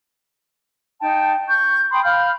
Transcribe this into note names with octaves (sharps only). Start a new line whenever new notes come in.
D#4 G5 A5
C#6 G6
G5 B5 C6 D#6
F5 B5 F6 G6